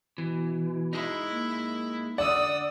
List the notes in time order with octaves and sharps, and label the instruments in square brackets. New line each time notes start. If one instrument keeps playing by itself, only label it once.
[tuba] B2 [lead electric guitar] E3
[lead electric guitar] G#3 D#4 [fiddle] E4
[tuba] A#3
[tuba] D3 [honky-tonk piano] D5 [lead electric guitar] F#5 [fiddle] D#6 E6